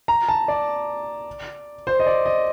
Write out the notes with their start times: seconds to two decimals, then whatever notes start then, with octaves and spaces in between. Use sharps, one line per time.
0.08 A#5
0.28 A5
0.48 D5
1.87 C5
2.00 D#5
2.06 D5
2.26 D#5